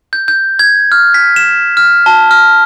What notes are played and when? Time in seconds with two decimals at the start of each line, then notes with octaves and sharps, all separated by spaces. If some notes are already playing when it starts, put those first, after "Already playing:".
0.13 G6
0.28 G6
0.59 G#6
0.92 F6
1.14 B6
1.36 E7
1.77 F6
2.06 A5
2.31 F6